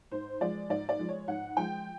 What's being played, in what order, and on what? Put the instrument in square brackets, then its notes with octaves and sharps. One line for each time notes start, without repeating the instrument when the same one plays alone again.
[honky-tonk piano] G#2 C5
F3 G#3 D5
G#2 D5
D5
F3 G#3
C#5
G#2 F#5
F3 G#3 G5